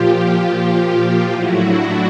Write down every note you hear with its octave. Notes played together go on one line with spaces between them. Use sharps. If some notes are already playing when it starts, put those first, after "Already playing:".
Already playing: A#2 F3 F4 G4
F4 G4
A2 F#3 E4 F#4
D4 E4